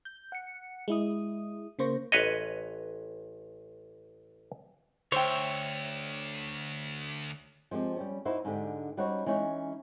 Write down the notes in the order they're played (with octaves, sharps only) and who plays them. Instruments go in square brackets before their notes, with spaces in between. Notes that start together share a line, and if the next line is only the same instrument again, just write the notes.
[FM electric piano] G6
F#5 C#7
G#3 E4 D#6
C#3 A#3 C5 C#6 A#6
[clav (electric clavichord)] A1 B4 C#5 D#5
[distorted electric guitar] D2 [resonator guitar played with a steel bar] C5 G5 [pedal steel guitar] C#5 E5
[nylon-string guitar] F3 G#3 C4 G4
G3 C#4
D#4 E4 F#4 C5
G#2 D3 G4
G3 C#4 D#4 F#4 C5 C#5
E3 G#3 C#4 D#4